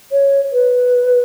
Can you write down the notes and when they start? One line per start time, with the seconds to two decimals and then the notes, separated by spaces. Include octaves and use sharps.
0.12 C#5
0.53 B4